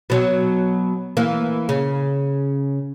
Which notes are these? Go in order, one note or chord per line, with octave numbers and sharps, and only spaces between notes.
B2 F#3
E3 A#3
C#3